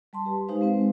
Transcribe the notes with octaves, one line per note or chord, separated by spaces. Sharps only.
G3 A5 C6
G4 B4
G#3 D#4 G4 C5 F5
G#3 C4 B4 C5